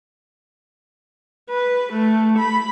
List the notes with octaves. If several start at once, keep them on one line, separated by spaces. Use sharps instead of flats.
B4
A3
B5